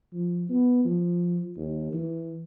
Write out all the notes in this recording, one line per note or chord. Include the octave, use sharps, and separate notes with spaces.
F3
B3
F3
D#2
E3